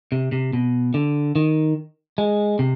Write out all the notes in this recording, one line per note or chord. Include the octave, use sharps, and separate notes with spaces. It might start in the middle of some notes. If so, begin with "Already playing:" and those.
C3
C3
B2
D3
D#3
G#3
C3